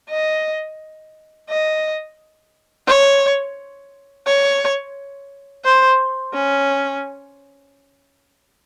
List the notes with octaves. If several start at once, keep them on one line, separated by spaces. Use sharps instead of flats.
D#5
D#5
C#5
C#5
C5
C#4